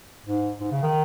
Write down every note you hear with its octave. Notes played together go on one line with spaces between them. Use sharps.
G#2
G#2
C#3
D#3